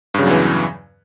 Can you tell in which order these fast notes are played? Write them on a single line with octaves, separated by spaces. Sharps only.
G2 C#3 F#3 E2 E3